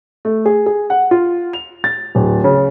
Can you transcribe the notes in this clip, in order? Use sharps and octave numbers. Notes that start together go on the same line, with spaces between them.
A3
G#4
G#4
F#5
F4
F7
A6
D1
C#3